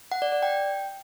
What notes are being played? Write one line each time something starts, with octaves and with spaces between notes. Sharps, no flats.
F#5
D5
D5
G5